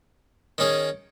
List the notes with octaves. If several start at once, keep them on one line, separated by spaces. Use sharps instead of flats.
D#3 C#4 G#4